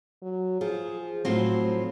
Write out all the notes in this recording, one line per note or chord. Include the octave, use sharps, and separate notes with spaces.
F#3
F3 G#4
A2 F3 F#3 C4